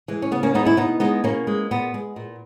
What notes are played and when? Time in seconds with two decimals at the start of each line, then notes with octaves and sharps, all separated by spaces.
0.08 E3 G#3
0.22 C#4
0.31 C#3 B3
0.43 A#3 C#4
0.54 E3 G#3 B3 D#4
0.65 C#4 E4
0.77 B2 B3 D#4
1.00 G#3 B3 D#4
1.24 B2 A#3 C#4
1.47 G#3
1.71 A#2 B3
1.94 G#3
2.16 A#2